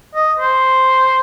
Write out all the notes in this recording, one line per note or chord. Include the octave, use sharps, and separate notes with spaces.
D#5
C5